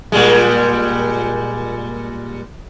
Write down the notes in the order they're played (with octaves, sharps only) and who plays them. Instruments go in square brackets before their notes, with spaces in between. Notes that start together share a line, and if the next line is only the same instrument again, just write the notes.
[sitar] A#2 G3 G#3